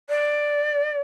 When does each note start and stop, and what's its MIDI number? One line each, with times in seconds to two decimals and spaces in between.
0.09 1.01 74